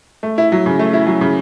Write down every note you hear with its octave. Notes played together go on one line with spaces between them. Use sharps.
A3
E4
F#3
C#3
A3
E4
F#3
C#3